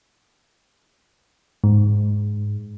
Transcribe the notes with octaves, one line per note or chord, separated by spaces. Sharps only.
G#2